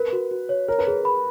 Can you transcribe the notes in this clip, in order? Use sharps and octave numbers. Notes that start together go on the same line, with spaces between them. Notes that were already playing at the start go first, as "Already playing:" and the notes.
Already playing: A#4 B4
F#4
F#4
C#5
A#4 C#5
B4
G#4 A#4
B5